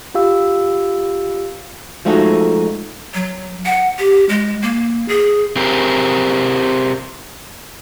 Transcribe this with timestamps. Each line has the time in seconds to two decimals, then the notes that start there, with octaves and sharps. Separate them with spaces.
0.14 F4 G4 F5 E6
2.05 F3 G#3 A3 D#4 F#4
3.14 F#3
3.66 F#5
3.99 G4
4.29 G#3
4.62 A#3
5.08 G#4
5.56 C4 G4 G#4 A#4